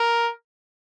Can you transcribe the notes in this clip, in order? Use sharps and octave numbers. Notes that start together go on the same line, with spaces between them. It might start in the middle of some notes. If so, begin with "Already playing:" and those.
Already playing: A#4